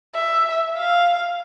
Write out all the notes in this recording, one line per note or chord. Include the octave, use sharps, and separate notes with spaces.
E5
F5